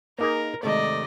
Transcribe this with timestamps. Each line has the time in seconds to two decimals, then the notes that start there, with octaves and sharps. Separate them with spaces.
0.19 A#3 D#4 G#4 A#4
0.63 G#2 C3 D#3 A3 D5 D#5